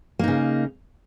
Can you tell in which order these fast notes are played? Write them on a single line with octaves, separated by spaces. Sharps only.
A#3 D#4 C#3